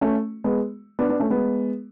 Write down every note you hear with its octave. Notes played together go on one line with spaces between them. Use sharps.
A3 C#4
G#3 B3
B3 D4
B3 D4
A3 C#4
G#3 B3